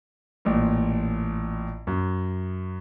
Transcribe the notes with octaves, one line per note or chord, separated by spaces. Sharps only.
A1 A#2
F#2